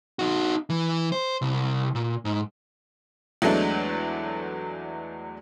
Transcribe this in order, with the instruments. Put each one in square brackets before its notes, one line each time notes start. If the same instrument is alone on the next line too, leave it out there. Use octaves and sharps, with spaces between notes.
[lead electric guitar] D#4 F#4
E3
C5
C2
A#2
G#2
[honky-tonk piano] E2 F#3 G#3 A3 D4